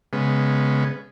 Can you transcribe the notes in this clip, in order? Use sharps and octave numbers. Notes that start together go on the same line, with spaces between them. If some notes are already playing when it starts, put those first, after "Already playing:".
C#3 G#3 B3